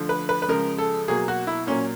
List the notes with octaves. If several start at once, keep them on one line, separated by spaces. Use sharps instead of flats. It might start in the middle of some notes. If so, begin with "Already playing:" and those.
Already playing: D3 F3 A3
B4
B4
B4
C#3 F3 G#3 A#4
A4
B2 F#3 A#3 G#4
F#4
E4
A#2 F#3 A#3 C#4